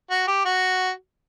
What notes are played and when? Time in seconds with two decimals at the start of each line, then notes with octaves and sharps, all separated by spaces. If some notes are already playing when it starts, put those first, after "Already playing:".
0.10 F#4
0.28 G4
0.45 F#4